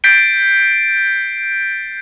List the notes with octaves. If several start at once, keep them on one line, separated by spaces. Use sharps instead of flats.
G6 A6 B6 C7 D7 G7